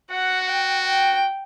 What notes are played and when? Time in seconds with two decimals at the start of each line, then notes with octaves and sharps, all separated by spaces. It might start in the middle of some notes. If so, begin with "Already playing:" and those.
0.11 F#4 F#5
0.49 G5
0.86 G5